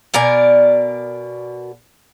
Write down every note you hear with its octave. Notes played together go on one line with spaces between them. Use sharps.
B2 A#4 D5 G#5